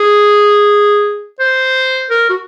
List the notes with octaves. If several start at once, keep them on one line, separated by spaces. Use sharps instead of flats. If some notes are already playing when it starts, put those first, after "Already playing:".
Already playing: G#4
C5
A#4
F#4